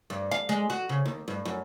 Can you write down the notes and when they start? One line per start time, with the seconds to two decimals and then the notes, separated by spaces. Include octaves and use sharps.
0.10 G2
0.31 F5
0.49 G#3
0.70 F#4
0.89 C#3
1.06 D#2
1.28 G2
1.45 F#2